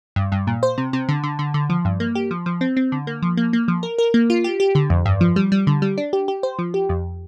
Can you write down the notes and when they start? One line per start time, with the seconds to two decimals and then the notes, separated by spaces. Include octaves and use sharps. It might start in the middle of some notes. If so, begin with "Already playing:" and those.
0.16 G2
0.32 G2
0.47 A#2
0.63 C5
0.78 C3
0.93 C3
1.09 D3
1.24 D3
1.39 D3
1.54 D3
1.70 F3
1.85 G2
2.00 A#3
2.15 G4
2.31 F3
2.46 F3
2.61 C4
2.77 C4
2.92 D3
3.07 A#3
3.22 F3
3.37 A#3
3.53 A#3
3.68 F3
3.83 A#4
3.98 A#4
4.14 A#3
4.30 F4
4.44 G4
4.60 G4
4.75 D3
4.90 F2
5.06 G2
5.21 F3
5.36 G3
5.52 G3
5.67 D3
5.82 G3
5.98 D4
6.13 G4
6.28 G4
6.43 C5
6.59 F3
6.74 G4
6.89 F2